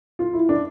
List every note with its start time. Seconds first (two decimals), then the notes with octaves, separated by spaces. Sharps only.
0.19 F4
0.33 E4
0.49 D4